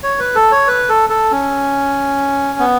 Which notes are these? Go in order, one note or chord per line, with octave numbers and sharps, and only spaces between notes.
C#5
B4
A4
C#5
B4
A4
A4
C#4
B3